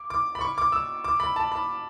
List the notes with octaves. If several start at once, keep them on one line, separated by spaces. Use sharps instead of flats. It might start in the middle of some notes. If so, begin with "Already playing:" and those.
Already playing: D6
D6
B5
C#6
D6
E6
D6
B5
A5
B5